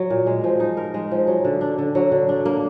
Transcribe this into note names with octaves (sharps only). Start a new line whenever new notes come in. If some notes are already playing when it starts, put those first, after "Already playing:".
Already playing: F#3
A#2
G#3
F3
D#4
A#4
G#3
F3
F#3
D3
D4
D3
F#3
D3
D4
A#3